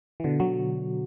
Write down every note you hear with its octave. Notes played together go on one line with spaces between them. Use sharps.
E3
B2 D3
D3 F#3